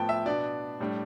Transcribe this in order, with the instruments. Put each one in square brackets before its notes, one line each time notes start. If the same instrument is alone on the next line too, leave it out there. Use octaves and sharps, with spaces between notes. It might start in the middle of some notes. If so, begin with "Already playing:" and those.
Already playing: [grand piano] A2 F3 B3 G5 A5
E5
B2 B3 D4 D5
A2 G3 D4